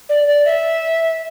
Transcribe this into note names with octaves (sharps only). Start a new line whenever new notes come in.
D5
D5
E5